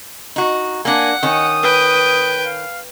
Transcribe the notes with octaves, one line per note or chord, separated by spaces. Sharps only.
D#4 F#4
A#3 D4 F#5 G#5
D#3 C#4 D#6
B4 G5
F5